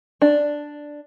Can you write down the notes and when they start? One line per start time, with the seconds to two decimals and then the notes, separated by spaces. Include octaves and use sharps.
0.22 D4